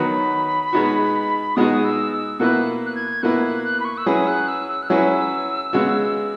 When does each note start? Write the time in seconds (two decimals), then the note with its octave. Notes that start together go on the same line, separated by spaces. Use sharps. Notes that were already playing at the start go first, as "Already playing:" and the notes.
Already playing: D#3 F#3 B3 F#4 B4 B5
0.73 B2 G#3 B3 D#4 F#4
1.56 B2 G#3 B3 D#4 F#4 D#6
1.85 E6
2.12 E6
2.40 B2 A#3 E4 B4 F#6
2.86 F#6
2.95 G#6
3.22 B2 A#3 E4 B4 F#6
3.44 F#6
3.64 F#6
3.80 B5
3.85 C#6
3.98 E6
4.06 F#3 C#4 E4 G#4 B4 D#6
4.27 F#6
4.48 E6
4.69 E6
4.83 F#6
4.89 F#3 C#4 E4 G#4 B4 E6
5.73 C#3 G#3 B3 F#4